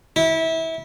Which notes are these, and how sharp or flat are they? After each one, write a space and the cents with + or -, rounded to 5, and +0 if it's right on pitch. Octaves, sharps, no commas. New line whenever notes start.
E4 -25